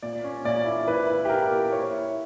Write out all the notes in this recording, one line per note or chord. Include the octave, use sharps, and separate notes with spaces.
A#2 D5
C#4
A#2 D5
E4
E4 B4
E4
G4
E4 A#4
A#2
E4 C#5
E4